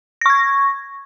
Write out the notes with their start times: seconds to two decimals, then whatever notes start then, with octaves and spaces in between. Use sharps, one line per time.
0.21 A#6
0.26 C#6
0.30 G#6